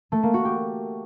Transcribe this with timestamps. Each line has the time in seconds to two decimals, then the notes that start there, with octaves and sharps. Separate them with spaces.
0.12 A3
0.23 A#3
0.34 F#4
0.45 G4